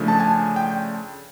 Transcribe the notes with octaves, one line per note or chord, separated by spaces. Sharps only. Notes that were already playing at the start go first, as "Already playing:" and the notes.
Already playing: C#3 F3 A3 D4
A5
G#5
G5